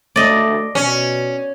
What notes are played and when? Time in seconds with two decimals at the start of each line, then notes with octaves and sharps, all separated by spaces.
0.16 A3 D5 D#5
0.75 B2 C#4